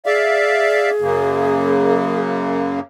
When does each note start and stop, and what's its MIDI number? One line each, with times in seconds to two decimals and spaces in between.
0.06 2.19 68
0.06 0.90 74
0.06 0.90 76
0.06 0.90 77
1.01 2.80 42
1.01 2.80 49
1.01 2.80 58